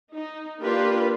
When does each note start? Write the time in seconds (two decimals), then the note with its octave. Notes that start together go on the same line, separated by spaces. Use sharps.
0.12 D#4
0.62 A#3 D4 F4 G4 A#4 B4